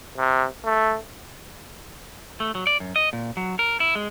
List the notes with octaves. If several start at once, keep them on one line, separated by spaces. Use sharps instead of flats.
C3
A3
A3
F#3
D5
F#2
D#5
A#2
F#3
A#4
E4
G#3